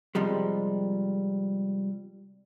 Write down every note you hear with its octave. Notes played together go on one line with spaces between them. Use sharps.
C3 F3 G3 G#3